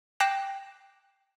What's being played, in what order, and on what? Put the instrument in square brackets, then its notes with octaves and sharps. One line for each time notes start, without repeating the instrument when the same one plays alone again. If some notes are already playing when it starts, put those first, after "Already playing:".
[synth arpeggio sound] G5 D6 F#6 A#6 C7 E7